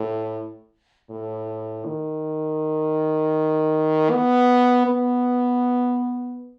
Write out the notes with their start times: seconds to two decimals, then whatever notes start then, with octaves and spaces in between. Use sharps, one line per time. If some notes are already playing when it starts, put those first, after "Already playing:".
Already playing: A2
1.10 A2
1.85 D#3
4.10 B3
4.85 B3